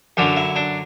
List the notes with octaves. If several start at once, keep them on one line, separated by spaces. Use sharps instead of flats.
F#2 D3 F#3 D4
E4
D4